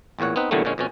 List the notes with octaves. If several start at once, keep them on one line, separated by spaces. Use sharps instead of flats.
A1 E2 A#2 C#5 F#5
B3 C4 D#4 B4
E2 A#2 D3 F#3 G3 A3
A#2 D3 G#3 C#4
F2 B2 C#4